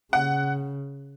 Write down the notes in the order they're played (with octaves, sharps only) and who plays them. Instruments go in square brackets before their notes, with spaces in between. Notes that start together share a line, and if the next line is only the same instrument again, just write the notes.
[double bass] C#3 [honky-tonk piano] F#5